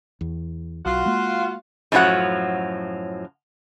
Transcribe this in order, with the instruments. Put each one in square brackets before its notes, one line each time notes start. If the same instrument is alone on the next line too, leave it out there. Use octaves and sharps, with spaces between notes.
[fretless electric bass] E2
[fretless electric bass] B1 [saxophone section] F4 F#4
[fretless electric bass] G#3 A#3
[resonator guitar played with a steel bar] F#2 A2 F3 F#3 F#5